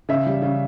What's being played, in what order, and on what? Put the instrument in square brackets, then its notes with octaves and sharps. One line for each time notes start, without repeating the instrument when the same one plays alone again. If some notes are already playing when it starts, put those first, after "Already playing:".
[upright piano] C#3 E5
G3
C#3